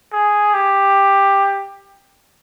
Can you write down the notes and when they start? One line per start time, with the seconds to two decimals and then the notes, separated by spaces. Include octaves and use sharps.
0.13 G#4
0.54 G4